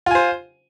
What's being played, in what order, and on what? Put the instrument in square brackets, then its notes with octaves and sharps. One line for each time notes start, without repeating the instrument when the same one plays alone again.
[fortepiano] F4
G#5
C5